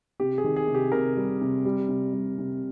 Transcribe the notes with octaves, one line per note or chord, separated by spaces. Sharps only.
C3 G4
G#4
D#3
G#4
C3
G4
C3 A#4
G3
C3
G3
C3
G3
C3